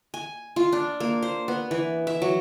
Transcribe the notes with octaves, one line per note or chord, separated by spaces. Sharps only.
G#5
F4
D4
A#3
C5
B3
E3
E5
F#3